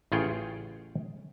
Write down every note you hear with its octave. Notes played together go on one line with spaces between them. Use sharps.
A1 C#3 F4 G#4 C#5 G5